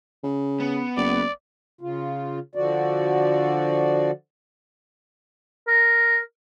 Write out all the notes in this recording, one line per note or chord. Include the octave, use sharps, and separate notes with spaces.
C#3
B3
F#1 D5
C#3 F4
D3 F3 F#4 D5
A#4